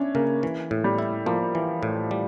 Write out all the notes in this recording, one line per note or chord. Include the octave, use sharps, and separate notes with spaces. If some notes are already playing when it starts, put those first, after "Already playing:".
Already playing: C#4 D4 E4
C#3 A#3
E3
A2
G3
E4
F3 A#3
E3
A2
G3